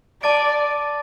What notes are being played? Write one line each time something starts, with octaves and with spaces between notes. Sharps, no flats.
D5 A5 D6 A6 D7